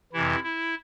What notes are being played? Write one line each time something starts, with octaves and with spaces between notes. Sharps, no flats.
F2 C3 E3 E4
E4